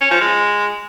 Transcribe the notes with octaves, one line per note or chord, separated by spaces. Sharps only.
C#4
F3
G#3